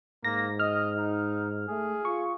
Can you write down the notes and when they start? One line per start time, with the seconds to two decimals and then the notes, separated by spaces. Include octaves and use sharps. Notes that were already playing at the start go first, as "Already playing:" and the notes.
0.24 G#2 A#3 A#6
0.60 D#5 F6
0.98 D#4
1.68 A3 G#4
2.05 F4 C#6